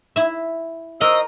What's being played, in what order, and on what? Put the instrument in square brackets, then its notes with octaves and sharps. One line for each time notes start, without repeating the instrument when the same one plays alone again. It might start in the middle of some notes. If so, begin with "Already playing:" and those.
[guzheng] E4 E5
[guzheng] A#4 [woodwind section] C5 C#6 E6 [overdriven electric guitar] D#5